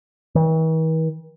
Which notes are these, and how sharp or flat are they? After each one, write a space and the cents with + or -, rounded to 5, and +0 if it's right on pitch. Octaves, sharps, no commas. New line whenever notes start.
E3 -45